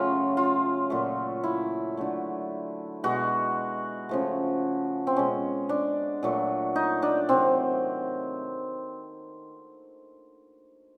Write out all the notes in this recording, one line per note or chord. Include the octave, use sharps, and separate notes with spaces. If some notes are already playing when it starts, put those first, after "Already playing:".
Already playing: C#3 F#3 A3 F4
F4
A#2 F#3 A3
E4
D3 F#3 A3
B2 G#3 F#4
C#3 F3 A3
C4
B2 G#3 C#4
D4
A#2 F#3 A3
D#4
D4
C3 D#3 F#3 C4